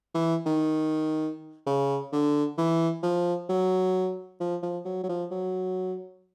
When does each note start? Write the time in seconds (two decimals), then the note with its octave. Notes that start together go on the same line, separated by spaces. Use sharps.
0.15 E3
0.46 D#3
1.66 C#3
2.13 D3
2.58 E3
3.03 F3
3.49 F#3
4.40 F3
4.63 F3
4.85 F#3
5.04 F#3
5.09 F3
5.31 F#3